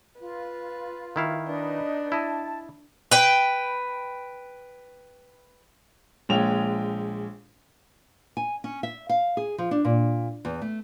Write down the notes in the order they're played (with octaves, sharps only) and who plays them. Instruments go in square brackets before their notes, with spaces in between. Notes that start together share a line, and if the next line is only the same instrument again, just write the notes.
[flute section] F4 [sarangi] B4
[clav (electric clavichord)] D#3 E4 F5
[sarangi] D4 [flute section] D#4 B4 D#5
[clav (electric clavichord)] E4 D#5 [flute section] A5
[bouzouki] B4 G5
[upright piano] A#1 G#3 C#5 G5 F7
[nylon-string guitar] G#5
C#4
E5
F5
G#4
F3
D4
A#2
E2
A3